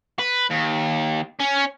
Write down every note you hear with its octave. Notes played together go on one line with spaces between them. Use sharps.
B4
D#2
C#4